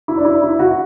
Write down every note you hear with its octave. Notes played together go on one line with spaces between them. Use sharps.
E4
D4
E4
E4
F#4